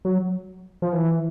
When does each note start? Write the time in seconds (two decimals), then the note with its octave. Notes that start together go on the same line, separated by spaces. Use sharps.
0.05 F#3
0.82 F3
0.93 E3